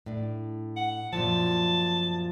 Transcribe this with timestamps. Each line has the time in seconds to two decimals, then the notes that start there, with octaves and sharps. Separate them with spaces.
0.06 A2 D4
0.76 F#5
1.13 F#2 A#2 F3 A5